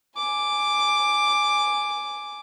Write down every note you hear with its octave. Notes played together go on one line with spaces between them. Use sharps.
G#5 D6